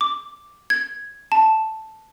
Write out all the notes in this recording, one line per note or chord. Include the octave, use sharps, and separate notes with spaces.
D6
G#6
A5